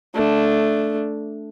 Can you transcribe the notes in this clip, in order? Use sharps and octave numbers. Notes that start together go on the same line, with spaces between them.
A3 D4